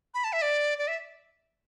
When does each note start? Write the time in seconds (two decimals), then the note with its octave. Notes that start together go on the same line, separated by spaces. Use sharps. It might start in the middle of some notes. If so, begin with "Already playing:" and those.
0.14 B5
0.24 A5
0.33 E5
0.42 D5
0.78 D5
0.88 E5